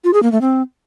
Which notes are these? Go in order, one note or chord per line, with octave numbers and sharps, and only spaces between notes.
F4
G#4
A#3
A3
C4